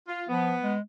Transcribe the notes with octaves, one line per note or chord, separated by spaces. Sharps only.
F4
F3 B3
G#3